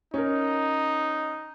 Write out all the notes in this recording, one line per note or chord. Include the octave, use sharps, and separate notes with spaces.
C#4 D#4 A#4